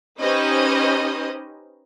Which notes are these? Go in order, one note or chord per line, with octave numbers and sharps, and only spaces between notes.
C#4 D#4 G4 B4 C5 D#5